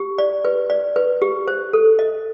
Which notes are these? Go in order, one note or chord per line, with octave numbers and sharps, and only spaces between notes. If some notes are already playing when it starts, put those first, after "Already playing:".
Already playing: G4
D5
B4
D5
B4
G4
C5
A4
D#5